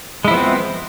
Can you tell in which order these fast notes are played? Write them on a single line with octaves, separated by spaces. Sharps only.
G#3 E4 F3 B3 C4